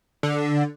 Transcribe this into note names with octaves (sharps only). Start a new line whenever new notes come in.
D3